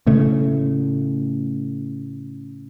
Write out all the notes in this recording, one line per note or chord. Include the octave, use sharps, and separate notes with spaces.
A2 C#3 A3